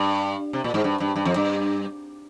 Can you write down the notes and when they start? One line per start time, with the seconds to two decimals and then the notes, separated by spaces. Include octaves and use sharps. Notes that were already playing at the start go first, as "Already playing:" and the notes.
Already playing: G2
0.53 C3
0.64 A#2
0.74 G#2
0.84 G2
1.00 G2
1.16 G2
1.25 F2
1.36 G2